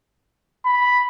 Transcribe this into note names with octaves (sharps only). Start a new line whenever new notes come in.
B5